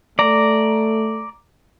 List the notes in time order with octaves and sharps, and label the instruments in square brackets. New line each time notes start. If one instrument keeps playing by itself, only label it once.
[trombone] A3 [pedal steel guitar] D5 A#5